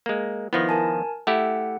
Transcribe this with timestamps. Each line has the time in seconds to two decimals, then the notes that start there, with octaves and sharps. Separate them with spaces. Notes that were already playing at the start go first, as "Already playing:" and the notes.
0.06 G#3 A#3
0.53 D#3 F3 B3 E4 A#6
0.69 A#4 G#5 A5
1.27 A3 E4 G4 F#5